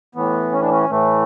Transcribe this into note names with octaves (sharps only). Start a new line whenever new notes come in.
A2 E3 B3
C#4
D4
C#4
A2 E3 A3